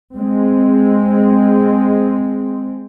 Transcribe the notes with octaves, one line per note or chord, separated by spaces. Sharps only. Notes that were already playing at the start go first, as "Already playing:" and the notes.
G#3 C4